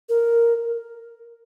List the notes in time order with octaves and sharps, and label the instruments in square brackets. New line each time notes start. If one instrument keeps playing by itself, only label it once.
[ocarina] A#4